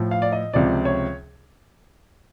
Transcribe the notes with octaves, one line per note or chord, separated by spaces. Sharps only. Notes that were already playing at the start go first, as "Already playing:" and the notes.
Already playing: A2 F3
F5
D5
D#5
C#2 C3 F3 D5
C#5